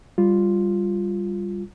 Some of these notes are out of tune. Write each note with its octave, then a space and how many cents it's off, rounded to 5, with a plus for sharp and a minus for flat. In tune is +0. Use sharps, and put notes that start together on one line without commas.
G3 +10 F4 +0